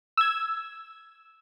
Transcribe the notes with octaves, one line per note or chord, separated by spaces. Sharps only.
E6 G#6